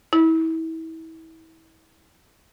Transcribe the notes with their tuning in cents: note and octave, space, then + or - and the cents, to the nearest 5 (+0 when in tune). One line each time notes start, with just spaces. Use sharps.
E4 -30